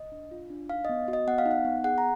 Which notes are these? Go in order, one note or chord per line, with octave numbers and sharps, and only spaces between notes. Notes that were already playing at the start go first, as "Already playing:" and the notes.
Already playing: D#5
D4
F4
D4
D#4 F5
B3 D#5
F#4
D#5
B3 F#5
F5
D#4
F#5
B3
G#4 F#5
A#5